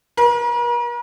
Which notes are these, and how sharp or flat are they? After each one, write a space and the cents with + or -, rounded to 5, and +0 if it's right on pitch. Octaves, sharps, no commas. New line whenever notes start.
A#4 +45